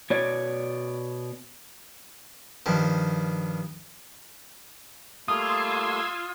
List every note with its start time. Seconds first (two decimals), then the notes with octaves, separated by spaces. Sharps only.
0.10 B2 C#5 D5
2.66 G2 D#3 F3
5.28 G3 A3 A#3 F4 C6 D#6 E6 G#6